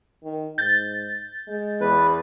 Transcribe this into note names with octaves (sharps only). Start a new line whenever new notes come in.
D#3
G#2 G6 A6
G#3
E2 B4